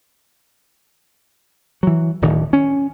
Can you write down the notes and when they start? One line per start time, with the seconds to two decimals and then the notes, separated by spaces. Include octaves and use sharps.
1.83 E3 F#3
2.22 D1 D2 D#3
2.53 C#4